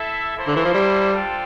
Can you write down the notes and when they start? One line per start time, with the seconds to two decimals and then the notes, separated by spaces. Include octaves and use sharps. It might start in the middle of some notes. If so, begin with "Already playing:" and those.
Already playing: E4 A4 E5
0.37 A#3 E4 A4 C5
0.47 D3
0.56 E3
0.65 F3
0.74 G3
1.11 D4 F4 A4 C5 G5